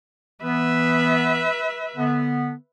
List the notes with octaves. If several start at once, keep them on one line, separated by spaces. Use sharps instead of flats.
E3 B3 B4 E5
D3 B3